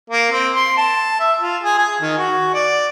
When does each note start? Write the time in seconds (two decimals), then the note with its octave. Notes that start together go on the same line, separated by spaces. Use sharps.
0.10 A#3
0.32 C4
0.55 C6
0.78 A5
1.20 E5
1.40 F4
1.63 G#4
1.78 G#4
2.02 D#3
2.18 F#4
2.54 D5